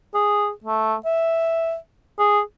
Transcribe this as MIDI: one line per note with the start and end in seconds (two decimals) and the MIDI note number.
0.14 0.51 68
0.64 0.95 57
1.05 1.76 76
2.19 2.41 68